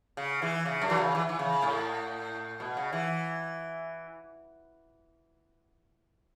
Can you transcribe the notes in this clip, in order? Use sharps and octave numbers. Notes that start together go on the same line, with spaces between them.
C#3
E3
C#3
F#2
E3
C#3
E3
E3
C#3
A2
B2
C#3
E3